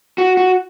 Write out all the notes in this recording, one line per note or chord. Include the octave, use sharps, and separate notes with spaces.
F#4
F#4